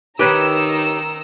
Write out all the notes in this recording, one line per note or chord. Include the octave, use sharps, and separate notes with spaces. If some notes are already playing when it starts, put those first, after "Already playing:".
D#3 D#4 G4 B4 C#5 A#5 E6